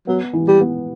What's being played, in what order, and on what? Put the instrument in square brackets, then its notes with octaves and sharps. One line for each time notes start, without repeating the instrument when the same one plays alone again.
[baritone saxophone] F#3 [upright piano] B3
[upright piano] E3
[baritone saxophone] G3
[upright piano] B3